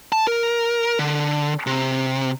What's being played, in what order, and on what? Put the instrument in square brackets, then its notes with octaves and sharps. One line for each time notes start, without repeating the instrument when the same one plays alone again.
[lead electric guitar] A5
A#4
D3
C3